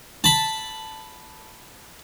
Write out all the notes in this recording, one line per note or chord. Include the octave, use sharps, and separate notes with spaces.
A5 B5